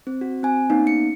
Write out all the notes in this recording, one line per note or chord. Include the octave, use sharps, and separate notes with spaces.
C4
F#4
C4 G#5
A#3 B3 C#4 D#4
C#7